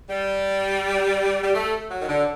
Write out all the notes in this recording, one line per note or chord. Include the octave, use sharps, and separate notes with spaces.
G3
G3
A3
F#3
D#3
D3